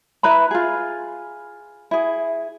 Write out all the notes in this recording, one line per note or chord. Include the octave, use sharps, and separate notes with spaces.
E4 B4 A#5 B5
F4 G#4
E4 G#4